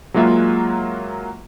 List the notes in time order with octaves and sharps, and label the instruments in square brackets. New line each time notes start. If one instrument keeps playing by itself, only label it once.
[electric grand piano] F#3 G#3 A#3 F4 E5 F#5